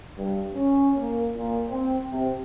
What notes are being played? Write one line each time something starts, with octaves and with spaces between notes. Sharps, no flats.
G2
C#4
A#3
A#2
C4
C3